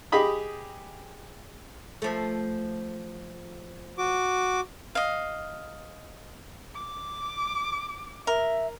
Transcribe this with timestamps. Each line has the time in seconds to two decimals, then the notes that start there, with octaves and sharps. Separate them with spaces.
0.12 G4 G#4 D#5 B5 D#6
2.02 F3 A3
3.98 F#4 D6
4.95 D#5 F5
6.75 D6
8.27 A#4 E5